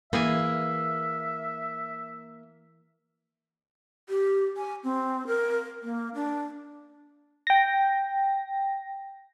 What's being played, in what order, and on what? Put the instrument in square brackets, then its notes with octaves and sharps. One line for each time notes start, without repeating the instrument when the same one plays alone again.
[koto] E3 G#4 G#5 [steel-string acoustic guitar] A#3 [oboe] E5
[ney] G4
G#5
C4
A#4
A#3
D4
[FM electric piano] G5 A#6